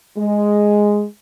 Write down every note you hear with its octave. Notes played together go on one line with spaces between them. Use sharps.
G#3